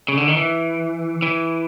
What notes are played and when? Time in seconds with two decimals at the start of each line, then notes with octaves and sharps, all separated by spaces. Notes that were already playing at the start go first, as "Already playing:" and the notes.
0.08 C#3
0.17 D3
0.28 D#3
0.37 E3
1.22 E3